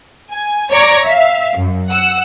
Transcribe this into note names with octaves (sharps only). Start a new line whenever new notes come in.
G#5
C#5 D5 A#5 C#6 A#6
E5 F5
F#2
F#5 E6